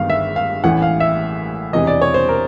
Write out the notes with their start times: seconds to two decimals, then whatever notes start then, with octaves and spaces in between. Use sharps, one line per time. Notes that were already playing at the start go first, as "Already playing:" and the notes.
Already playing: G1 G2 D#3 G#3 B3 F5
0.10 E5
0.36 F5
0.64 A1 A2 E3 F#5
0.82 F5
1.00 E5
1.73 E1 E2 C3 E3 D#5
1.87 D5
2.01 C#5
2.14 C5
2.29 A#4